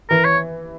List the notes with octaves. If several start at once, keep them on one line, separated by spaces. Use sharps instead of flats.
E3 A#4
C#5